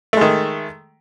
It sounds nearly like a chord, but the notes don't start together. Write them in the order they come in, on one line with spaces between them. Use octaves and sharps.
A3 G#3 D#3